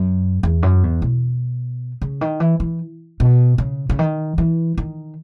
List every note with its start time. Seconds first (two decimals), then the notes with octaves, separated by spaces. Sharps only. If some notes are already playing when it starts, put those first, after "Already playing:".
Already playing: F#2
0.43 E2
0.63 F#2
0.83 E2
1.02 B2
2.01 C#3
2.21 D#3
2.40 E3
2.60 E3
3.20 B2
3.58 C#3
3.89 C#3
3.99 D#3
4.38 E3
4.78 D#3